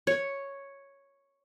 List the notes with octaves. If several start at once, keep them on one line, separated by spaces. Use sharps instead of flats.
C#5